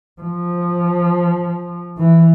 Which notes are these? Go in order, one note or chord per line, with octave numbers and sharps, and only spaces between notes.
F3
E3